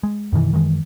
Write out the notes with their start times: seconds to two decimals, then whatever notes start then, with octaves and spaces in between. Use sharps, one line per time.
0.03 G#3
0.33 F#2 B2 D#3 E3
0.53 F#2 D#3 E3 G#3